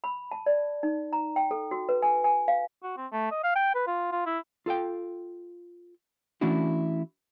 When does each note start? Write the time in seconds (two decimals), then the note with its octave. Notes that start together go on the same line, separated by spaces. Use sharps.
0.04 B5
0.31 A5
0.46 D5
0.83 D#4
1.13 A#5
1.36 G5
1.51 A4
1.71 F#4
1.89 B4
2.02 G#5
2.24 G#5
2.48 F5
2.83 F#4
2.97 C4
3.12 A3
3.31 D#5
3.43 F5
3.55 G5
3.74 B4
3.87 F4
4.12 F4
4.26 E4
4.66 F4 A4 F5 G5
6.41 E3 A3 C#4 D4 E4 F#4